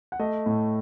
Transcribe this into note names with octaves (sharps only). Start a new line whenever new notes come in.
F#5
A3 D#5
A2